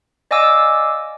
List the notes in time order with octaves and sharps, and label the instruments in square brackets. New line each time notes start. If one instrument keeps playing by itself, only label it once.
[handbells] D5 D#5 F5 G#5 D6 E6